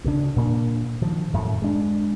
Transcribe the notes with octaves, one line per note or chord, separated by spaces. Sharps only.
D2 C#3 D4
A#2 A#3 C4 D4
D#3 F3
F#2 A2 A3
G#3 D4